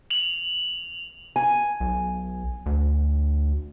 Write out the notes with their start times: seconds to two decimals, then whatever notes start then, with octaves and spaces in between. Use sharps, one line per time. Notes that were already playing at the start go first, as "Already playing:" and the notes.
0.10 F7 F#7
1.36 G#5
1.80 B1
2.66 D2